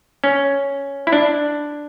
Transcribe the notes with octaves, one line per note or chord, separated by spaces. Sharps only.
C#4
E4
D4